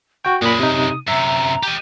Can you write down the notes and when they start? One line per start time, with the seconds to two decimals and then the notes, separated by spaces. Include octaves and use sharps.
0.25 F#4 G5 C#6
0.42 F#2 A#2 G#3 B5 D#6
0.59 C3 D#4
1.08 F#2 C3 E5 A#5
1.63 G4 D#5